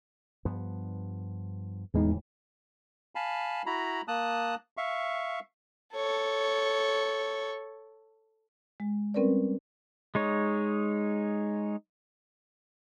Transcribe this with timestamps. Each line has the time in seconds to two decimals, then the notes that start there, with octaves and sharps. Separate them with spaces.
0.45 G2 F3 B3
1.94 D1 E2 A2 E3 G#3 D#4
3.15 F5 G#5 A5 B5
3.66 E4 F#4 A#5 B5
4.08 A#3 A5 D#6 F#6
4.77 E5 F5 C#6
5.95 A4 C#5
8.80 G#3
9.14 G3 C4 C#4 A#4 B4 D5
10.15 G#3 D#4 C#5